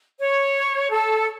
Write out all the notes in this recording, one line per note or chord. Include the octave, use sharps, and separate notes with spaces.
C#5
A4